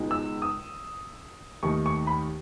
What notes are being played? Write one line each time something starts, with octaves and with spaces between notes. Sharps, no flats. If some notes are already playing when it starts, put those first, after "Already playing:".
Already playing: C#2 B2 G#3 D#4
E6
D#6
D#2 D#3 A3 D#4 C#6
C#6
B5